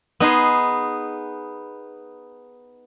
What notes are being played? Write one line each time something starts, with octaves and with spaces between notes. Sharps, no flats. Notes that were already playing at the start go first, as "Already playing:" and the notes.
B3 D#4 G#4 C6